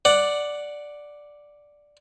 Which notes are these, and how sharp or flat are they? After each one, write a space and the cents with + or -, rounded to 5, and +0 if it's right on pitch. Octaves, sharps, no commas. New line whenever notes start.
D5 +0 F#5 +0